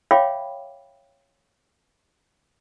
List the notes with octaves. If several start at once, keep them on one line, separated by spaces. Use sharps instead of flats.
C#5 E5 F5 G5 B5 D6